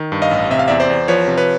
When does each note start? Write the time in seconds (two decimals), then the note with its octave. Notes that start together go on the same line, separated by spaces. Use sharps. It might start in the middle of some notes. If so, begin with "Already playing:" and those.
Already playing: D#3
0.12 G2
0.22 D#5 F5
0.31 A1
0.51 C3 E5
0.59 F5
0.68 E2 D5 E5
0.80 C5 D5
0.90 E2
1.08 F3 B4 C#5
1.28 C3
1.38 B4 C#5